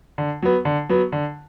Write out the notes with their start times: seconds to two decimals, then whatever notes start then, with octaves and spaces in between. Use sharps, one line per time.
0.18 D3
0.43 F#3 B3
0.65 D3
0.89 F#3 B3
1.12 D3